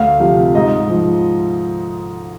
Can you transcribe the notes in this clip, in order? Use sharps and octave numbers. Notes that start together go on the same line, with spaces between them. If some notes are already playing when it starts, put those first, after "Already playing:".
Already playing: D2 F5
C3 F3
G#2 D#5
F3